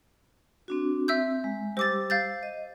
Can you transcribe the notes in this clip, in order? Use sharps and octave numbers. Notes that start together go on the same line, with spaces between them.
C4 D4 F#4
C4 E5 E6 G6
G#3
G3 G4 C5 D6 E6 A6
F5 G6 A6
D#5